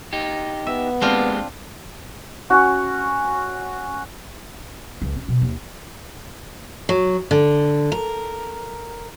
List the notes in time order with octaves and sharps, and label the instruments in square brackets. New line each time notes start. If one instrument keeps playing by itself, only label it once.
[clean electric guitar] D#4 G4
[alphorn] B3 [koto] E5
[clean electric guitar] G#3 A#3 G4 [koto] C4 D4 F4
[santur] C#4 F#4
[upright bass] C#2
C#4
B2
D#2
[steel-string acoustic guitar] F#3
D3
A#4